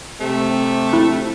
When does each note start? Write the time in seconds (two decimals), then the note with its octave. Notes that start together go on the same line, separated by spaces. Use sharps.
0.20 C3 A3
0.93 E4